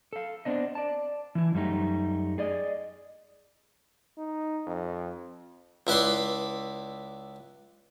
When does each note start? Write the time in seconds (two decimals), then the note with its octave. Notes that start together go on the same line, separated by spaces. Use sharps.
0.13 A4 F5
0.45 B3 C4 D4 D#5
0.75 D5 A5
1.35 E3 E4
1.54 F#2 G3 A3 D#4
2.38 G#4 D5 D#5
4.18 D#4
4.66 F2
5.87 C#2 E4 B4 D5 C6